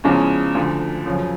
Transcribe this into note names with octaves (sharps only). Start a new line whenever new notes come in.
E2 C#3 F3 G#3 C#4
D2 D3 F3
F#2 C#3 F3